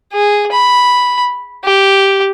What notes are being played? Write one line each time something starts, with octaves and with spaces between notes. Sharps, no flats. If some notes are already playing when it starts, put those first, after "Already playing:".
G#4
B5
G4